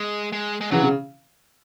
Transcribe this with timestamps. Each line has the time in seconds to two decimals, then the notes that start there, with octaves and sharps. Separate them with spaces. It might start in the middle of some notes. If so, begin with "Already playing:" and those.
Already playing: G#3
0.32 G#3
0.61 G#3
0.71 C#3 E3 F#3
0.83 C#3